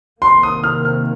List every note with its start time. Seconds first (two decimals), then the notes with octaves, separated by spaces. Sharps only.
0.21 C3 D#3 A#3 C6
0.43 D#6
0.64 F6
0.85 F6